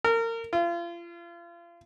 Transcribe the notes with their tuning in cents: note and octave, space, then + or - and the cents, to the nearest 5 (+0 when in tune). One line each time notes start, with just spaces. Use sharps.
A#4 -30
F4 -35